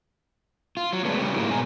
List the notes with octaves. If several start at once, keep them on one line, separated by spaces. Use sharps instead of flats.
F4
F#3
G#3 A3 B3 D4
C#3 G3 A3 C#4 G4
G#2 F#3 G#3 A#3 D#4 E4
G#2 B2 B3 G#4 G#5 A#5